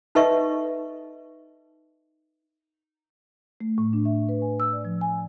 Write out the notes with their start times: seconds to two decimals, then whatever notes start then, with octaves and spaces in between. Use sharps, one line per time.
0.15 D#4 A4 B4 D#5 E5 C#6
3.60 A3
3.78 A2
3.93 D4
4.05 E5
4.29 B4
4.42 G#5
4.60 E6
4.73 D5
4.85 F3
5.01 G#5